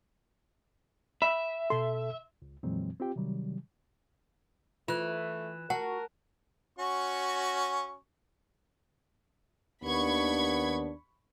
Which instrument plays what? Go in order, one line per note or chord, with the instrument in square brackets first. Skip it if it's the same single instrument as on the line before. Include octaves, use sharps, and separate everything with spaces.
[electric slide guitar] E5 [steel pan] B5
[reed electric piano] B2 A4 [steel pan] C6
[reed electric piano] C#2
F2 A#2 E3 F#3 G#3 C4
C4 F4 G4 G5
C3 D#3 F#3 G3
[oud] E3 [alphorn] A3 [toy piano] F4 [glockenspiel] F#6 E7
[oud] F#4 [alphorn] A#4 [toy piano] F#5 [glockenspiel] A5
[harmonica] C#4 F#4 C#6
[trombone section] D#2 D4 [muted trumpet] B3 [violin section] B5 C#6 G#6